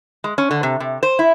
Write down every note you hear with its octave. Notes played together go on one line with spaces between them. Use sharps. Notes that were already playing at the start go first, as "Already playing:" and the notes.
G#3
C#4
D3
C3
C3
C5
E4